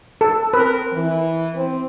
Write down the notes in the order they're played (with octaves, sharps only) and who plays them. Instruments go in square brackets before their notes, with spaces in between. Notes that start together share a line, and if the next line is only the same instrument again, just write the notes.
[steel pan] A4
[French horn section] C4 A#4 [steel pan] B4
[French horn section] E3
C4